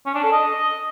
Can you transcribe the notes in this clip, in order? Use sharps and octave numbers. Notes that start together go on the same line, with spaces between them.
C#4
D4
A4
D#5